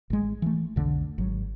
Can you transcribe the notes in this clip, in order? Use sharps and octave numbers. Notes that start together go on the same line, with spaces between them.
A1 G#3
E3 A3
B1 F2 D3 A3
G#1 F#3